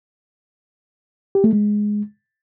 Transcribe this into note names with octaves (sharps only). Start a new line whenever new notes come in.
G4
A3
G#3